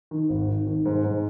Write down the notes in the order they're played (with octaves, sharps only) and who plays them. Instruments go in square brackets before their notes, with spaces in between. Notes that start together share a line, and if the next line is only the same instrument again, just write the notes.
[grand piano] D#3
G#1
D#3
D#3
G#2
G#2